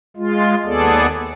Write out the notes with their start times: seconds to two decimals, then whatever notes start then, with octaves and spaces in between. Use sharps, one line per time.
0.17 G#3 F4
0.66 D#2 B3 G#4 A4 D5